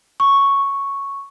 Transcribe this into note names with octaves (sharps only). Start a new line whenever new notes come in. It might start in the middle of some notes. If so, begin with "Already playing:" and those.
C#6